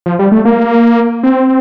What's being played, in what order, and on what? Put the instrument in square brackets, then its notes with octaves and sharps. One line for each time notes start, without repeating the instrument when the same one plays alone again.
[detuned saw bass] F3
G3
A3
A#3
C4